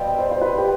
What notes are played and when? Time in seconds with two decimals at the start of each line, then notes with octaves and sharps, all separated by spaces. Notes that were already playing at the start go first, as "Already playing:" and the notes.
Already playing: B2 G3 C4 F4 B4
0.19 C5
0.31 C5
0.41 B4
0.58 G4